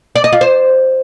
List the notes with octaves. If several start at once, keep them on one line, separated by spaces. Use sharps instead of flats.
D5
D#5
F4
C5